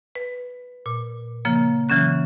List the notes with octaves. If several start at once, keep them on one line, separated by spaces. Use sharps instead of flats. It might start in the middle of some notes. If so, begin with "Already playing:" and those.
B4
A#2
C#3 F3 A#3
C#3 E3 F#3 C#4 F#6